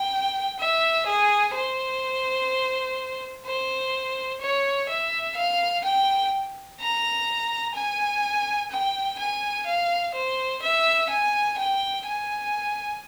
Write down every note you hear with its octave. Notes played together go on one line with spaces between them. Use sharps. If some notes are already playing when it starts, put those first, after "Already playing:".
Already playing: G5
E5
G#4
C5
C5
C#5
E5
F5
G5
A#5
G#5
G5
G#5
F5
C5
E5
G#5
G5
G#5